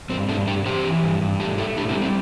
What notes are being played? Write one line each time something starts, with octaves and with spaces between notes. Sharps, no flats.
G2 C4
G2 A3 D4
G2 D4 G4
E3 G4 C5
E3
G2
G2
A3 D4 G4
A3 E4 A4
A2 D4 G4
C4 E4
G3
C4